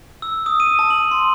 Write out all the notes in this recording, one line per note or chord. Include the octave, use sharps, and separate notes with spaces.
E6
D#6
D#7
A5
F#7
C6